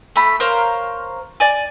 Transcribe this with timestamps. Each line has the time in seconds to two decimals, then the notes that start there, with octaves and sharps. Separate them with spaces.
0.16 A3 B5
0.40 A#4 C5 C#5 F5
1.40 D5 G#5